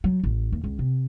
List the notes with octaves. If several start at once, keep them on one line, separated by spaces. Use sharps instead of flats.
F#3
A1
D#2
C#2
C3